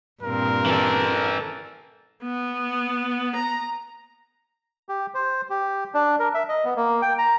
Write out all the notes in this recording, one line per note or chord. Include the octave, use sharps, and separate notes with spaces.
G2 A#2 C4 A#4
E3 A4
B3
A#5
G4
C5
G4
D4
A#4
E5
D#5
B3
A#3
G5
A#5